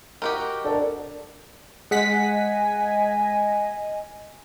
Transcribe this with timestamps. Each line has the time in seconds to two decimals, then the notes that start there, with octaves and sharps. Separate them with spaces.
0.22 D#4 F#4 G4 A#4
0.65 D4 A4 A#4
1.91 G#3 D#5 F#5 G#5 B6